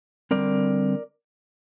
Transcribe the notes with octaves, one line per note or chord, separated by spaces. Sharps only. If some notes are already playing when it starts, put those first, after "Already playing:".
D3 G3 C4 A#4 D5